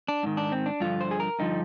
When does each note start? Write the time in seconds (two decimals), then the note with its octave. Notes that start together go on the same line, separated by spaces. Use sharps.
0.08 D4
0.23 G#2 D#3
0.37 D4
0.52 C4
0.66 D4
0.80 G2 D3 F3 F4
1.01 C5
1.11 G#4
1.20 A#4
1.39 G2 D3 F3 D#4